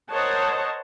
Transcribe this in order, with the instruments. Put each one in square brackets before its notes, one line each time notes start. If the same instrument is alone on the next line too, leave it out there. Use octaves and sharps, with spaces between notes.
[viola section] A#4 C5 C#5 D#5 F#5 A5